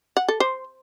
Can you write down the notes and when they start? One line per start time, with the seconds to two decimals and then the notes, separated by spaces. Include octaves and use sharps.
0.17 F#5
0.29 A4
0.40 C5